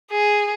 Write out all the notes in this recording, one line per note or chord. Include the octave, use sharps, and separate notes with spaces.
G#4